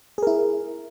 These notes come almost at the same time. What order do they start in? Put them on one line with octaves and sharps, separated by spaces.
G#4 A#4 E4